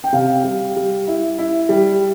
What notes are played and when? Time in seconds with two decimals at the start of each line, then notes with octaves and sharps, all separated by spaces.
0.04 G5
0.12 C3 F5
0.44 G3
0.76 G3
1.07 E4
1.38 E4
1.69 G3